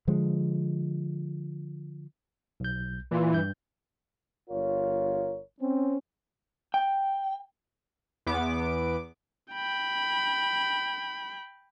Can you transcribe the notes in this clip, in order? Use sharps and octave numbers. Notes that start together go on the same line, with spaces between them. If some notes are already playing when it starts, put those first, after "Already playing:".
D3 F3 G#3
B1 G6
A#2 E3 F4
G2 G6
G1 F4 A#4 C#5
C4 C#4
G5
E2 B3 D6
G5 B5